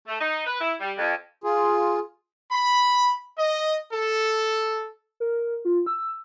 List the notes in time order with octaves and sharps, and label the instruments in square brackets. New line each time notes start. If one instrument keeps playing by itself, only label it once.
[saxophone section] A3
D#4
B4
E4
G3
F2
[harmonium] F4 G#4
[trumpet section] B5
D#5
A4
[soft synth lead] A#4
F4
E6